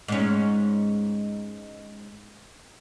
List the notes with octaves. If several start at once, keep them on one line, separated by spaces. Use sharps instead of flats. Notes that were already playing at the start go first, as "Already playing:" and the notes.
G#2 C#4